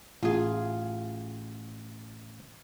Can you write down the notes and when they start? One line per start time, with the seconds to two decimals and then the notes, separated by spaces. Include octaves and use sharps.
0.23 A1 F4 G#4